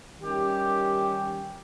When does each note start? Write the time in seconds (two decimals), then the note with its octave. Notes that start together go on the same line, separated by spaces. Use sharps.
0.20 D#3 G3 C#4 G4